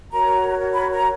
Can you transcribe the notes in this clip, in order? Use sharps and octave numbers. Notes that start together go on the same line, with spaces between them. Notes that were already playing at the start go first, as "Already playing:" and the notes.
F#4 A#4 C#5 A#5
B5
A#5